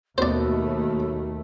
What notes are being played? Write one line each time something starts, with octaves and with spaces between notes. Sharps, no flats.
D#2 B2 A3 B3 F#4 C5 D5